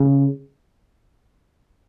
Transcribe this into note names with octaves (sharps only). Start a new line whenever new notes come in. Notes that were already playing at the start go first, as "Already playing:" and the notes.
Already playing: C#3